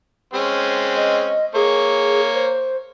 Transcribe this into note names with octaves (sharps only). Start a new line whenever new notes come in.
G#3 C4 C#4
D#5
A#3 G#4 C#5
C5